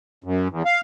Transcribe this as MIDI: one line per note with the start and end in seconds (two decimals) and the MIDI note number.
0.24 0.48 42
0.49 0.63 40
0.65 0.81 77